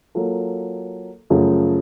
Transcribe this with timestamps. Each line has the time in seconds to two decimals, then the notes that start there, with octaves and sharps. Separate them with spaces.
0.15 F#3 A#3 F4 A4
1.30 F#2 C#3 F3 A3